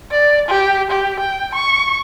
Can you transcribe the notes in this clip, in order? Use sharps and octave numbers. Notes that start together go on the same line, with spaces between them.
D5
G4
G4
G5
C#6